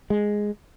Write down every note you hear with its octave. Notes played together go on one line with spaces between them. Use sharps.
G#3